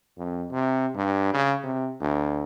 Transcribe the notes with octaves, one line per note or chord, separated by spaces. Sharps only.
F2
C3
G2
C#3
C3
D2